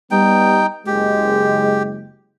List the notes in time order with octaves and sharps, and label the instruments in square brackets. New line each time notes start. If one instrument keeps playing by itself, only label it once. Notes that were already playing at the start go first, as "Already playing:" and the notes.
[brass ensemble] G3 B3 [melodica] D#4 G5
[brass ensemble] F#1 G#3 [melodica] G4